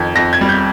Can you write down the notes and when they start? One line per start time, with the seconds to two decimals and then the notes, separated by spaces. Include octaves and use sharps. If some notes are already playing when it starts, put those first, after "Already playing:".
Already playing: F2 D#3 G#6
0.15 F2 A#6
0.33 G#6
0.41 G3
0.49 G6